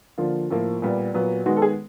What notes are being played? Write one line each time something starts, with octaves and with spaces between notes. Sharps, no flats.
D3 F3 A#3 F4
A2 F3 A#3
A#2 G3 B3
A#2 F#3 B3
D#3 G#3 B3 F#4
A4
G#4